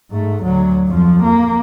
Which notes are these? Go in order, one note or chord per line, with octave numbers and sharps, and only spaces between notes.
G#2 A3
D2 F#3
F2 F3
A#3